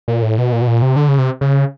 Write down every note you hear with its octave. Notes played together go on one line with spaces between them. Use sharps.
A#2
A2
B2
A#2
B2
A#2
C3
D3
C#3
C3
C#3